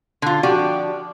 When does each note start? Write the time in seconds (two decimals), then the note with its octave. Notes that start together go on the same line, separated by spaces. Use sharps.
0.22 D3 F4
0.43 F3 D4 F#4 G4